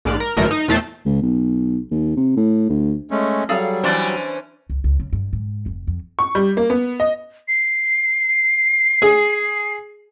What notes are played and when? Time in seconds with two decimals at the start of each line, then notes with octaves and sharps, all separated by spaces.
0.05 A#1 G#2 D5 F6 F#6
0.20 A#4
0.37 G#1 F#2 D3 E3 A3 A#4
0.51 D#4
0.68 E2 A#2 A3 A4 C5
1.06 C#2
1.22 B1
1.91 D#2
2.17 C3
2.36 A2
2.69 D2
3.11 G#3 A3 C#4
3.49 F#3 G3 G#4 A4 F5
3.84 E3 C#4 D4 C5 D5
4.70 C#2
4.84 C#2
5.00 C#3
5.13 G2
5.33 G#2
5.66 F1
5.87 F2
6.19 C#6
6.35 G3
6.57 A#3
6.70 B3
7.00 D#5
7.48 C7
9.02 G#4